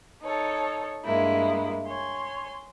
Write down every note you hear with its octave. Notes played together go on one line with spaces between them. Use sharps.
D#4 A4 C#5
G2 G#3 A#3 E4
C#5 G#5 C6